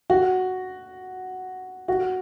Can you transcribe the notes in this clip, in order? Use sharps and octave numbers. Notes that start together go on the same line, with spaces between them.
F#4
F#4